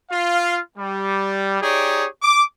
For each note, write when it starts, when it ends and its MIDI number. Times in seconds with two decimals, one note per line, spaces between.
0.11 0.59 65
0.11 0.59 77
0.77 1.60 55
1.61 2.06 63
1.61 2.06 67
1.61 2.06 68
1.61 2.06 73
1.61 2.06 74
2.23 2.43 86